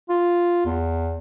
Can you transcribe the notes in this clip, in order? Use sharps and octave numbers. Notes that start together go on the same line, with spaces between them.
F4
E2